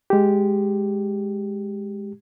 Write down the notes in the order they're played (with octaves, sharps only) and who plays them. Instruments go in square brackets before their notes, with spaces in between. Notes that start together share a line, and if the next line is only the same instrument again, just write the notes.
[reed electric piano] G#3 G4